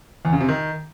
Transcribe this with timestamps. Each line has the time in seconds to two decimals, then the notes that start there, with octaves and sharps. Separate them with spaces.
0.25 E2
0.33 C#3
0.41 C3
0.48 D#3